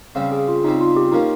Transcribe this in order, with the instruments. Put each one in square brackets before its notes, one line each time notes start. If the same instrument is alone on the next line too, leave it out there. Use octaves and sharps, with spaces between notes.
[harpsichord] C#3 G3 C4 [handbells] F5
[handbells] G#4
F4
[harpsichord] C#3 G3 C4 [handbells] D#4
[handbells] F4
G4
[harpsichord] F3 A#3 C#4 F4 [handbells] D#4